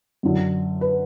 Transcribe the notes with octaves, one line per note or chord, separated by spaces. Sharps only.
F#2 D3 F#3
B4